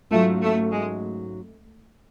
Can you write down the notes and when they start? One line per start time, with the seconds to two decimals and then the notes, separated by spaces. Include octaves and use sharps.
0.11 G#2 F#3 A3 C#4 F4
0.42 A3
0.72 G#3